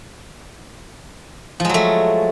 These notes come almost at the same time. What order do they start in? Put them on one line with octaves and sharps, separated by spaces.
F3 G#3 F#3 A3